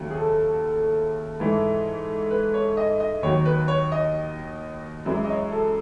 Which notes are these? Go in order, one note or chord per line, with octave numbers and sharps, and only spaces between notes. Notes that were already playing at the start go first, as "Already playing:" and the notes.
Already playing: D#2 C#3 F#3 A3
G#4
A4
G#2 E3 A3
B4
C#5
D#5
D#5
D#2 D#3 F#3 C#5
B4
C#5
D#5
F#2 E3 G#3
D#5
C#5
A4